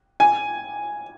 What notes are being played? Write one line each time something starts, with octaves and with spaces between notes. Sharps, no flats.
G#5